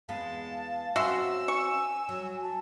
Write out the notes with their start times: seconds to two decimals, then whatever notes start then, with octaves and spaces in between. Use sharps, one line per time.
0.09 E2 G#3 B3 F5 A5
0.96 F#3 C4 C#4 F#4 E5 C6 E6
1.48 G#5 C#6
2.09 F#3 G#5
2.43 A5